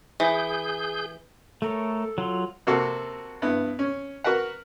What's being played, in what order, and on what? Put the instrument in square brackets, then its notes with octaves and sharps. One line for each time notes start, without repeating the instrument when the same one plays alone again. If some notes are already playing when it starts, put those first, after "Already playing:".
[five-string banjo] E3 [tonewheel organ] G#4 G6
[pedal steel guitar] A3 A#4 C#5 [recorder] A4
[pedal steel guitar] F#3 F4 C6
[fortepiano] C3 A#3 F#4 A4
G2 B3 E4
C#4
F#4 A#4 B4 F#5